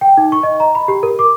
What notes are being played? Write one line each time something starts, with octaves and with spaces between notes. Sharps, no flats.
G5
D#4
C#6
D#5
A#5
B5
G4
A#4
D6